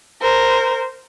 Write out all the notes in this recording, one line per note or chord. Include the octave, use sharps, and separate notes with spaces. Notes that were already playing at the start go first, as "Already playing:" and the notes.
A#4 C5